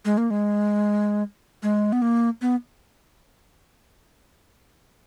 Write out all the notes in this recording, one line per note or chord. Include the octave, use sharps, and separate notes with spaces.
G#3
A#3
G#3
G#3
B3
A#3
B3